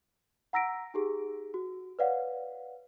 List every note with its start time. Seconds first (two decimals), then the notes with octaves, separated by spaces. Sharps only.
0.53 F#5 A#5 E6 A#6 B6 D7
0.94 D#4 G4 G#4
1.54 F#4
1.99 B4 C#5 D5 F5 F#5